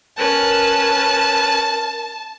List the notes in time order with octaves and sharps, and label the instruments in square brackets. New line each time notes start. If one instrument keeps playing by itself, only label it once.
[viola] C#4 B4 [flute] A#4 [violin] A5